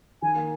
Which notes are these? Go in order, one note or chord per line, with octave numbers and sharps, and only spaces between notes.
D#3 G#5
A#3